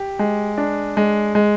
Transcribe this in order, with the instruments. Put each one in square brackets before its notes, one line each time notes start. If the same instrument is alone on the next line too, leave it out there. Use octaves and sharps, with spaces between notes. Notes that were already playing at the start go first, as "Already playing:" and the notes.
Already playing: [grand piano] G4
G#3
D4
G#3
G#3